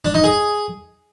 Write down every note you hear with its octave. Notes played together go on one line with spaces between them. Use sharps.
D4
D#4
G#4